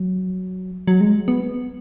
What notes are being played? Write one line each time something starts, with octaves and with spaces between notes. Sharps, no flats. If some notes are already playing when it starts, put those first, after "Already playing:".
Already playing: F#3
F#3
G#3
B3